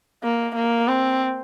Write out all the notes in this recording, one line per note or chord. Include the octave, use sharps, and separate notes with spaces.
A#3
A#3
C4